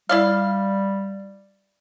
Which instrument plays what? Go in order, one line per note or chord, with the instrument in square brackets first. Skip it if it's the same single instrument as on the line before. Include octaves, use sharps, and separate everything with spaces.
[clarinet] G3 [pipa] E4 D5 F5